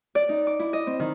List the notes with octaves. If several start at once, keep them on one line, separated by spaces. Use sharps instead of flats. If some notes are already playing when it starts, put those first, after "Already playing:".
D5
D#4
D6
E4
D#5
C4
D#3